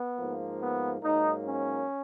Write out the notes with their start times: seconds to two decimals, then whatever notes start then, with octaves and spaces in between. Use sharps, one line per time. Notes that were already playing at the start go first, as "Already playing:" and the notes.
Already playing: B3
0.16 G#2 F3 A#3
0.60 B3
1.01 G#2 F#3 A#3 D#4
1.44 C#4